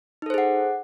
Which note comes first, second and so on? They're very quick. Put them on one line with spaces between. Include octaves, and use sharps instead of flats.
D#4 A4 C5 G#4 F#5